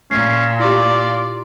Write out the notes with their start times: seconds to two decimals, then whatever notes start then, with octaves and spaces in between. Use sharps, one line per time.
0.11 A#2 C#4 C7
0.60 E4 F4 G4 D5